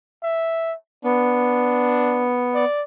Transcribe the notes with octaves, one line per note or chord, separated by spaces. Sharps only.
E5
B3 D4
D5